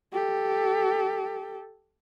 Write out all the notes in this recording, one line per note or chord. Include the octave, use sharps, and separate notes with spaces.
G4 A4